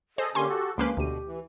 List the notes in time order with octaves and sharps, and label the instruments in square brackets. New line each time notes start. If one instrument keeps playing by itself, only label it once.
[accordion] G#4 A4 D#5 [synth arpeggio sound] C5
[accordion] D3 A#3 C#4 [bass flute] G4 [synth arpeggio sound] G#5 C6
[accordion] F#4 A4
[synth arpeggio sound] C#2 A#3 B4 [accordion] F3 C6 D6 [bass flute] C#4
[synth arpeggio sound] D2 D#7 [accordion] B2 [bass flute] G4
[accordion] E3